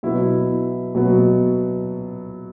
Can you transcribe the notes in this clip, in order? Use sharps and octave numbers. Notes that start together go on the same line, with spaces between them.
B2 F#3 B3 E4
B2 F#3 B3